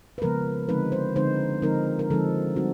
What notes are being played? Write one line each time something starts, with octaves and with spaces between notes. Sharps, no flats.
B4
C#3 F3 G#3 B3 A#4
D3 F3 G#3 C4 D#4 B4
C5
D3 F3 G#3 C4 D#4 C5
D3 F3 G#3 C4 D#4 A#4
A#4
D3 F3 G#3 C4 D#4 A4
G3 C4 D#4 F#4